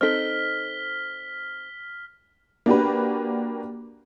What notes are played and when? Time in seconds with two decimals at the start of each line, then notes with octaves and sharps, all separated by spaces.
0.01 C4 D#4 A4 F6 B6 G7
2.66 A#3 D4 F#4 G4 B4